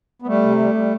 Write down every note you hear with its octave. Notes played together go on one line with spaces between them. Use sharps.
B3
G3 A3
C3
G3
G3